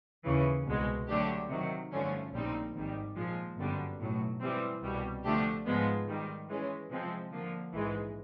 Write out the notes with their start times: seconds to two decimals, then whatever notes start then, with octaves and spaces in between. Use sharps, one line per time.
0.25 D#2 C#3 E3
0.66 C2 B2 G#3
1.08 D3 F#3 A3 D4 G4
1.49 C3 D#3 F#3
1.91 G2 D3 F3 A3 C#4
2.33 A#1 A#2 G3 C4 D#4
2.75 G#1 G#2 D#3 G3
3.16 A#2 F3 G#3
3.57 G1 F#2 D3 G3 B3
4.00 B1 A2 F#3
4.41 E3 G3 C4
4.82 C2 B2 G3
5.24 D3 F3 A3 D4 G4
5.65 G#2 F3 G#3 B3
6.07 G#2 D#3 G3
6.48 E3 G#3 C#4
6.90 C3 F3 G#3 C4
7.32 D3 F3 A#3
7.73 A#1 G#2 E3 G#3